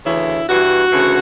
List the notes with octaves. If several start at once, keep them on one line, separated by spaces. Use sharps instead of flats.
D2 C#3 E3 E4
G2 E3 F#4
D2 C#3 E3